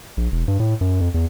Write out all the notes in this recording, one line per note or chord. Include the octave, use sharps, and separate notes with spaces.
A#1
E1
G2
A2
F#2
F2
E2